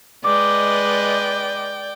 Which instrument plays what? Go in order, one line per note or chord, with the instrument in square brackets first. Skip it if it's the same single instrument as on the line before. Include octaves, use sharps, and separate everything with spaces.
[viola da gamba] G#3 B4 D#5 [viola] D5 G5 [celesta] D6